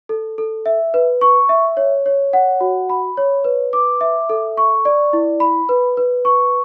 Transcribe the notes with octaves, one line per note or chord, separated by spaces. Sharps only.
A4
A4
E5
B4
C#6
E5
C#5
C#5
F#5
F#4
B5
C#5
B4
D6
E5
A4
C#6
D5
E4
B5
B4
B4
C#6